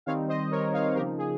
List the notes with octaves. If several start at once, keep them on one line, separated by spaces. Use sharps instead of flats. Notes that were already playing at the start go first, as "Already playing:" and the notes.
D#3 G3 C4 D#4 C#5 F5
C5 D#5
A#4 C#5
C#5 F5
C#3 F3 A#3 D#4 G4 A#4
G#4